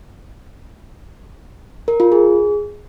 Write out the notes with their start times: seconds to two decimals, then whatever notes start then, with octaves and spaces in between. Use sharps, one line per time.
1.88 A#4
2.00 F4
2.12 G#4